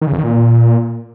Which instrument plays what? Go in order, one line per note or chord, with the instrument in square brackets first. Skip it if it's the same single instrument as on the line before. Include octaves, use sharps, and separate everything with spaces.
[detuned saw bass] D#3
C#3
F2
D#3
A#2